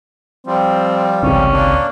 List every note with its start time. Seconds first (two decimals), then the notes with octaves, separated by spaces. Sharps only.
0.47 F3 G3 C4
1.23 G#1 C#2 C3 C#4
1.52 A#3 D4